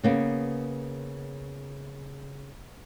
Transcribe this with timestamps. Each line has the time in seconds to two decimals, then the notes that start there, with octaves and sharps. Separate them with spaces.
0.03 C#3 A#3 B3